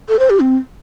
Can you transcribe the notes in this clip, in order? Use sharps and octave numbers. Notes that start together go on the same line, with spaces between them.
A4
C5
G4
C4